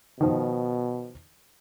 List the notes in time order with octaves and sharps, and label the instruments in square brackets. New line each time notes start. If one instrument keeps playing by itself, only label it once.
[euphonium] B2 [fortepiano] D#3 F3